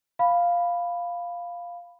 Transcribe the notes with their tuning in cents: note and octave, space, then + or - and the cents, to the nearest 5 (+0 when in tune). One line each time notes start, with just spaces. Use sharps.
F5 +0 B5 +0